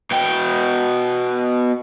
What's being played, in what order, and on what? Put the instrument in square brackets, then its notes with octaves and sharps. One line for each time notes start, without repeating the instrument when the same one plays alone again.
[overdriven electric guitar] B2 G5